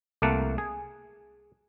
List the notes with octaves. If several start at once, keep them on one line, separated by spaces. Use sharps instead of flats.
C2 A3 A#3 F#5 A5
G#4